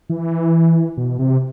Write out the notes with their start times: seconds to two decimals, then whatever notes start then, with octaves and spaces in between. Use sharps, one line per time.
0.10 E3
0.97 B2
1.19 C3